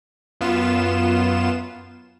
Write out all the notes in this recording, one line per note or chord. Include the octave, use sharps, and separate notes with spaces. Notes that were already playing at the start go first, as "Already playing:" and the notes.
F#2 B3 F4 E7